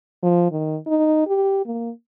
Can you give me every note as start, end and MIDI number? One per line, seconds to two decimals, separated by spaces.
0.23 0.48 53
0.52 0.77 51
0.87 1.24 63
1.27 1.62 67
1.65 1.90 58